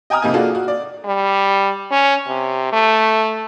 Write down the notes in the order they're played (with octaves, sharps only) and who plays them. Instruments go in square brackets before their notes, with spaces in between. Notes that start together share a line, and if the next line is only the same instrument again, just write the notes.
[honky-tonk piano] D#5 G5 G#5 A#5 D#6 F6
F2 C3 A#3 D#4 G#5
A#3 D4 F4 F#4 G#4 A4
F#4
D5
[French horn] G3
C#4
C3
A3